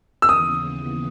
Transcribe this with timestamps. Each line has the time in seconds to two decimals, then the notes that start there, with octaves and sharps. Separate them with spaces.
0.22 E6
0.29 D#2 C#3 E3 B3 D#6